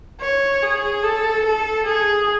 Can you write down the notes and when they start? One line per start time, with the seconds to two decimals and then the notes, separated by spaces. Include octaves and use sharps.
0.21 C#5
0.62 G#4
1.03 A4
1.45 A4
1.86 G#4